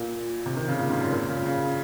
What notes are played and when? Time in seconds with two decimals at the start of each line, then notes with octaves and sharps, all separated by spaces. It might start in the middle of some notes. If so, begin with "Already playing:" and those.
Already playing: A#2
0.46 C3
0.57 D#3
0.68 C#3
0.79 A#2
0.90 G#2
1.01 F#2
1.12 A#2
1.29 C#3
1.45 C#3